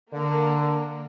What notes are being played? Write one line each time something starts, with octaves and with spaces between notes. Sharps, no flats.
D3 A#3